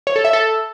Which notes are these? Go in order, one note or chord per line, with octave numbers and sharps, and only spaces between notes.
C#5
A4
E5
A4